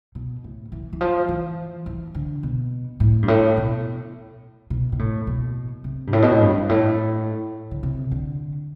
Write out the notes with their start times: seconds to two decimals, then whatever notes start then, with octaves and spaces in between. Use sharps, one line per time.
0.15 B2
0.44 A2
0.72 E3
0.93 E3
1.01 F3
1.28 E3
1.86 E3
2.15 D3
2.43 B2
3.00 A2
3.23 G2
3.28 A2
3.57 B2
4.70 B2
4.92 B2
4.99 A2
5.27 B2
5.84 C3
6.07 G2
6.13 A2
6.22 B2
6.31 A2
6.41 G2
6.58 G2
6.69 A2
7.71 D3
7.83 C3
8.11 D3